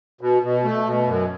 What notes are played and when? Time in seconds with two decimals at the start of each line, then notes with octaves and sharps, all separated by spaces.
0.21 B2
0.42 B2
0.64 A3
0.86 B2
1.06 F#2